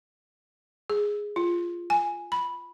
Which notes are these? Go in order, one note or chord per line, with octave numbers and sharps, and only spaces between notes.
G#4
F4
G#5
B5